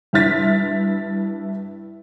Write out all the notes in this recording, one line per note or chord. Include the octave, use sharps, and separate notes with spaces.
G2 E4 E5 F6 A6 B6